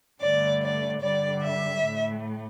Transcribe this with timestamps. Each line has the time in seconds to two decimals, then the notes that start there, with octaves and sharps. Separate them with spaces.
0.22 G2 D3 A3 D5
0.62 D5
1.02 G2 D3 G3 D5
1.43 E5
1.84 A2 A3